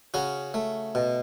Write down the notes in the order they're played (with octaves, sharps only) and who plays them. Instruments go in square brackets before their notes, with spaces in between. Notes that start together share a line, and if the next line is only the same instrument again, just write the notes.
[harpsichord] C#3 C#4 F#4
A3
B2